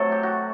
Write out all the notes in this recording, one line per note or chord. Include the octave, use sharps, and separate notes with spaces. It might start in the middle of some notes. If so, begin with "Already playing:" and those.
Already playing: C3 F#3 A3 A4
G4
F#4